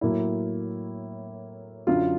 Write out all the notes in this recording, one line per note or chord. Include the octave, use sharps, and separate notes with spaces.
A2 F#3 A#3 E4
F#2 D3 F#3 F4